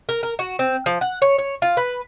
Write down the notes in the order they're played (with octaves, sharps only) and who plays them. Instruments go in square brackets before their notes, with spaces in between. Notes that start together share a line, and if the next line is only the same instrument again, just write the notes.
[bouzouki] A#4
A#4
F#4
C4
F3
F#5
C#5
C#5
F4
B4